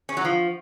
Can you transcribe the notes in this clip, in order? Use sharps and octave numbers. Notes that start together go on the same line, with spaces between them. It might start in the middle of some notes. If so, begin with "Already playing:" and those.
C#4
F#3
F3